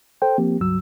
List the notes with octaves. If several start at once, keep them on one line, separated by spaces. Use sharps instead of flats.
A4 C5 G5
F3 A#3 C4 G4
C#2 G2 F#3 E6